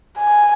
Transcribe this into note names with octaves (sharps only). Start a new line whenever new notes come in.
G#5